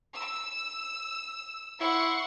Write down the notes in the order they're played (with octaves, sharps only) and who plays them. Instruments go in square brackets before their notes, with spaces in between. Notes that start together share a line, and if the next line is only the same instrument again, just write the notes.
[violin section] E6
[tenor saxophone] E4 [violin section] F#5 C6 C#6